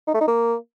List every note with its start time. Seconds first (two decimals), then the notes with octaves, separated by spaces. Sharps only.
0.07 D#4
0.14 A3
0.21 D#4
0.28 A#3